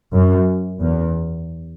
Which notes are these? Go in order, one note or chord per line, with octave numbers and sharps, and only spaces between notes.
F#2
E2